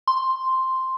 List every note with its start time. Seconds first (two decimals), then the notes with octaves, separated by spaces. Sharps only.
0.08 C6